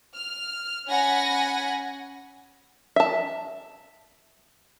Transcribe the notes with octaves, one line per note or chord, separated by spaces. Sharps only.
F6
C#4 F#5 G#5 B5 A#6
E5 A5